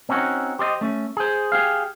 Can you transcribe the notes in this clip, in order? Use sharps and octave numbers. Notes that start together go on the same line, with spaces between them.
C4 C#4 D#4 F#4
G4 C5 D5 D#5
A3 C#4
G#4 C5
G4 G#4 F5